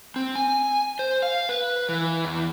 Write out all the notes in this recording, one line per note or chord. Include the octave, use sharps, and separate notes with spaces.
C4
G#5
C5
F5
B4
E3
E2